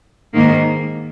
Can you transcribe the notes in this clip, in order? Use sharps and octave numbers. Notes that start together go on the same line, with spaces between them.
G#2 D#3 A#3